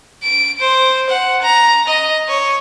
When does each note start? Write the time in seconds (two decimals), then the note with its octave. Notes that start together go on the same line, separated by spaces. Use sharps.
0.23 D7
0.60 C5
1.10 F#5
1.42 A#5
1.88 D#5
2.28 C#5